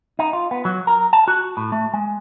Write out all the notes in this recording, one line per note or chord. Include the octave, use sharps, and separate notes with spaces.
D#4
F4
B3
F#3
A#4
A5
F#4
A2
A3
G#3